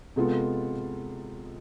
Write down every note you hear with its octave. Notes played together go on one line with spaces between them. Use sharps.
C3 G#3 B3 F4 A4